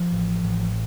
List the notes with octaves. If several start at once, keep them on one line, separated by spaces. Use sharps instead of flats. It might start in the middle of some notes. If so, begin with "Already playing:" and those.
Already playing: F3
A1
A1